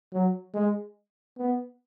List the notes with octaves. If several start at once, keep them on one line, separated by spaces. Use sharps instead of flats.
F#3
G#3
B3